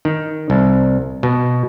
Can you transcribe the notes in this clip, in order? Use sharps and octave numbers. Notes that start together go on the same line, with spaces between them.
D#3
C2
B2